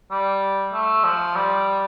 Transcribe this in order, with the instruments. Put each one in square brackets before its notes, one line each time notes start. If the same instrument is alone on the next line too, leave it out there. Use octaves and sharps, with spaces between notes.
[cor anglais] G3
A3
F3
G3